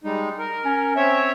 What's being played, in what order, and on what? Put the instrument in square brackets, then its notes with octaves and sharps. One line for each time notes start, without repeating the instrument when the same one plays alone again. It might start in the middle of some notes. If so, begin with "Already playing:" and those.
[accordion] G3 G#3 D#4
A#4
[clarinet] C#4
[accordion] C4 C#5 E5